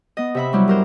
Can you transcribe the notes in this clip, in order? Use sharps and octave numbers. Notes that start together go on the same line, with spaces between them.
B3 D#5
C3 E5 B5
F#3 G3 E4
G2 A#4 C5